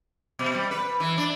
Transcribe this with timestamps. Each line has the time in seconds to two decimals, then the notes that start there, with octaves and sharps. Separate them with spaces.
0.39 B2
0.54 G3
0.71 B4
1.00 E3
1.18 D4